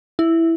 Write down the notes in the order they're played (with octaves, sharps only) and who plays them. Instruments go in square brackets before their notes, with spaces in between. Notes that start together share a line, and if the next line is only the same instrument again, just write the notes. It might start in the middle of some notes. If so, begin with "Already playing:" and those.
[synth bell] E4